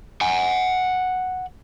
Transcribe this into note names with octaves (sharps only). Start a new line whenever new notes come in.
F#5 G#5